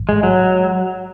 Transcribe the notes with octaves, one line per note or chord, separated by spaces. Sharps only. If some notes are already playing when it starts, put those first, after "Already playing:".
Already playing: A1 G#2
G#3
F#3